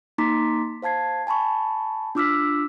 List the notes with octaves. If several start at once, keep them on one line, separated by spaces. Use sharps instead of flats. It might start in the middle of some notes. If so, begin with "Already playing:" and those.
A#3 D#4 A#5 C6 D6 B6
C5 F5 A5 G#6 C7
G#5 A5 B5 C#6
D4 F4 D6 E6 F6 B6